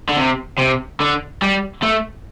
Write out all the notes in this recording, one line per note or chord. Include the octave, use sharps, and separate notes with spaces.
D3
C3
C3
D3
G3
A3